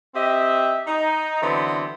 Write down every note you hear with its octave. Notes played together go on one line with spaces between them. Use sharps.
C4 G4 D#5 E5
D#4
D3 E3 F#3 B3 C4